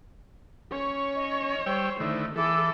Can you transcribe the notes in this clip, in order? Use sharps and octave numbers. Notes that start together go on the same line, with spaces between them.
C#4 C#5
D#5
G3 C5 G5 E6
D3 D#3 A3 E4
E3 E4 G#4 A4 D6